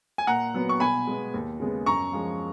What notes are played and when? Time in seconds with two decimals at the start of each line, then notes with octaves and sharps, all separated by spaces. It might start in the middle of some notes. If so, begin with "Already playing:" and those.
0.18 G#5
0.27 A#2 F#5 A#5
0.54 F#3 B3
0.69 C#6
0.80 B2 G#5 B5
1.07 G#3 B3
1.34 D#2
1.60 C#3 G#3 B3
1.86 F#2 A#5 C#6
2.13 F3 G#3